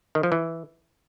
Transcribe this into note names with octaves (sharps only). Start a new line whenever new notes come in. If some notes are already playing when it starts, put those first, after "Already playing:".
D#3
F3
E3